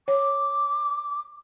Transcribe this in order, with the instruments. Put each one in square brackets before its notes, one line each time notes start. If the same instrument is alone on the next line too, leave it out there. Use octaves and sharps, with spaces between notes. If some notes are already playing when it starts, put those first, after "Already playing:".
[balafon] C#5 [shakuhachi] D6